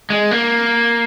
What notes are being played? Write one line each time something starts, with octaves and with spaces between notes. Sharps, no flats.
G#3
A#3